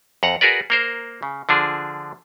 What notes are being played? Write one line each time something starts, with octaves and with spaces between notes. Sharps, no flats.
F2 F#5 A#5
F#4 G#4 A#4 B4 D5
A#3 A#4 C5
C#3
D3 F3 D4 G#4